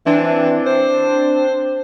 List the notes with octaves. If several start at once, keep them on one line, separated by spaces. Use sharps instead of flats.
E3 C4 D4
C5